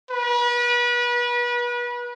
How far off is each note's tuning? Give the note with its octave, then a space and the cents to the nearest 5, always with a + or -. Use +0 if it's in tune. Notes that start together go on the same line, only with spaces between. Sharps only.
B4 -35